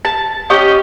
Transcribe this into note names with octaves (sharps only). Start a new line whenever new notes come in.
A5
C#4 G4 D#5 G5